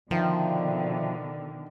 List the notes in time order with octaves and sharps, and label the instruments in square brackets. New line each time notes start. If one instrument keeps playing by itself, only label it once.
[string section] B2 D3 [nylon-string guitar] D#3 [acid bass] F3 [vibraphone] E5 G5